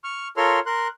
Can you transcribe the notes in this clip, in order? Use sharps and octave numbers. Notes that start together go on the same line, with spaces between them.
C#6 F6
F4 A4 A#4 C#5 C6 F6
A#4 C6 F#6